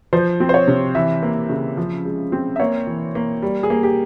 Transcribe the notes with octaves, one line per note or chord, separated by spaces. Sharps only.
F3 C5
C4
C5
C#5
C3
E3 E5
A#3
C#3
F3
G#3
C4
E5
A#3 C#5
E3
A#3
G3
G#4
A#3
G4